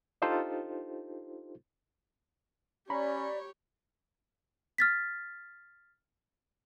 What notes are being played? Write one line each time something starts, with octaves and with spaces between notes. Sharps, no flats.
D4 D#4 F4 G4 A4 C5
C#4 G4 C#5 D5 A#5 B5 C#6
F6 A6 B6